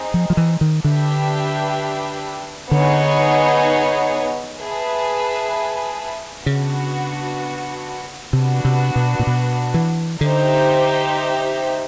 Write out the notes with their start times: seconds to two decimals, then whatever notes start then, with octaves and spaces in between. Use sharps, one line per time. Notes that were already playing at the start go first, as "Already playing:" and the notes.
Already playing: C4 D#4 G#4
0.14 F3
0.30 F3
0.37 E3
0.61 D#3
0.84 D3 D4 G4 B4 E5 G5
2.71 D3 B3 D#4 G#4 C#5
4.59 G#4 B4 E5 A5
6.46 C#3 B3 D4 F#4
8.33 C3 B3 D4 F#4
8.65 C3
8.96 B2
9.19 A#2
9.27 B2
9.74 E3
10.21 D3 D#4 G4 C5 E5